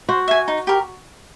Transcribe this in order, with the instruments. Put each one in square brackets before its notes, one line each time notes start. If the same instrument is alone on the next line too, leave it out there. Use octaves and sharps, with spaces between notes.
[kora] F#4 [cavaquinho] C5
[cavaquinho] E5 G#5
D#4
G4 A#4